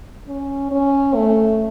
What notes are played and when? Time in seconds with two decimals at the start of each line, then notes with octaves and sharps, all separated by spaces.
0.27 C#4
0.71 C#4
1.15 A3